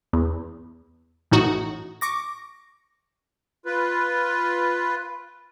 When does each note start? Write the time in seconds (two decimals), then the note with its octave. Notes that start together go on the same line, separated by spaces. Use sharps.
0.13 E2
1.32 A1 A2 D#4 F#4
2.01 C#6 D6 A#6
3.66 F4 B4